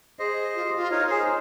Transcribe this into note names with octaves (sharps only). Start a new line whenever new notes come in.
G#4 C5 D#5
F4
G4
F4
D#4 A#4 C#5
G#4 C5